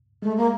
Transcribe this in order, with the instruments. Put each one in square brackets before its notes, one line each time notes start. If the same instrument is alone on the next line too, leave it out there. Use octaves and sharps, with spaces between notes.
[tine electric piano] G#3 [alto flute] A3
[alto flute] A#3